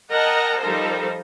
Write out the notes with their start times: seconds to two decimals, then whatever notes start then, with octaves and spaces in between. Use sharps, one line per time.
0.11 A#4 D#5 F#5 G5 A5 A#5
0.60 F3 G3 D#4 A4 A#4 C5